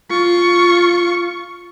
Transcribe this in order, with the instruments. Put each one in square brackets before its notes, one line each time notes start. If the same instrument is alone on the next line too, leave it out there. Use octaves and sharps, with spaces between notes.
[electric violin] F4 C#6